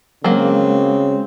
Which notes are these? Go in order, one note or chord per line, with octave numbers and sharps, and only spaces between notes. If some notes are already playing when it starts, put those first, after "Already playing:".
C#3 F#3 G#3 A#3 C4